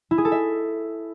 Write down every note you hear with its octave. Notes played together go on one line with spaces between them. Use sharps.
E4
G#4
A4
E5